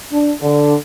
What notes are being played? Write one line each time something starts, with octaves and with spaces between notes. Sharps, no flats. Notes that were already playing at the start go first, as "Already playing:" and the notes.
D4
D3